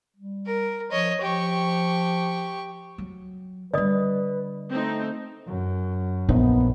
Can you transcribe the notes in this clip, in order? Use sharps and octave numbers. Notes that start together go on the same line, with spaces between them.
G3
A#4
F3 C#5 D#5
F3 G4 C#6
F#3
D3 G3 B4 D5 D#5 D#6
A3 C4 D#4
F#2
A#1 B3 D#4